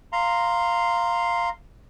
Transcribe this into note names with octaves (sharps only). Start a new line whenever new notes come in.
F5 A#5 C6